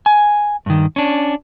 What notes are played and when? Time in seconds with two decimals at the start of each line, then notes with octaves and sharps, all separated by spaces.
0.06 G#5
0.66 G2 D#3
0.96 C#4 D4